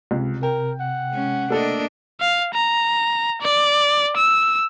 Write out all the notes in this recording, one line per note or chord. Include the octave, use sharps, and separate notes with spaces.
C#2 C3
A#4 G5
F#5
G#3 C#4
A3 A#3 D4 A4 D#5
F5
A#5
D5
E6